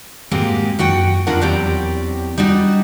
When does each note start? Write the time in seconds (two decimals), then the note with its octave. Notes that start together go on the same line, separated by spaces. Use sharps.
0.31 G#2 G#3 A#3 C4 F#4 G4
0.79 F#2 F#4 F#5 G5
1.27 F2 D3 D4 F4 A#4 F#5
1.41 E2 F#3 C4 G4 D5
2.38 G3 D4 D#4 F#4